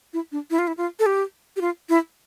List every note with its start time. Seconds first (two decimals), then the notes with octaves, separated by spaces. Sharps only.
0.13 E4
0.32 D4
0.51 E4
0.59 F4
0.67 E4
0.77 F4
0.99 A4
1.06 G4
1.56 G4
1.61 F4
1.89 E4